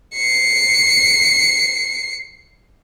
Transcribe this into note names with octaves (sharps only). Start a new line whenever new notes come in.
C7 C#7